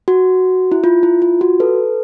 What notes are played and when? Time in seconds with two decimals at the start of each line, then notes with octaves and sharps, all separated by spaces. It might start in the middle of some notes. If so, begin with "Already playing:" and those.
0.08 F#4
0.72 E4
0.84 F4
1.03 E4
1.22 F4
1.41 F#4
1.60 A4 B4